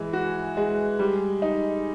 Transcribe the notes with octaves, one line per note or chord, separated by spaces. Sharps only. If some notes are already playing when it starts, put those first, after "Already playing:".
Already playing: E3 G#3
F#4
G#3
G3
D#4